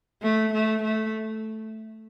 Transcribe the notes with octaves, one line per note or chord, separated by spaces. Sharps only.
A3
A3
A3